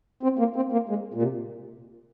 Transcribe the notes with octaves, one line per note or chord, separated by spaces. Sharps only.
C4
A#3
C4
A#3
G#3
A#2
C3